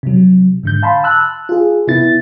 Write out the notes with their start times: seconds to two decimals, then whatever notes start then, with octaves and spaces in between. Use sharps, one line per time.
0.03 C3 F#3
0.63 G#2 D3 G6
0.83 F5 A5 B5 C6
1.03 A5 E6 F#6
1.49 F4 G#4
1.87 C3 B3 E4 A6